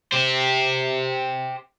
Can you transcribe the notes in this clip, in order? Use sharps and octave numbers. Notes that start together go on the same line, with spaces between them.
G4 C5